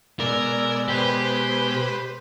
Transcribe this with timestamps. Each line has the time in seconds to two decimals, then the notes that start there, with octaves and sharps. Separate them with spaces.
0.20 B2 G#3 A#4 D5 E6
0.88 G4 B4 C5 B5